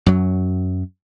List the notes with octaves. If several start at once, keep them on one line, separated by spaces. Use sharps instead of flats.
F#2 F#3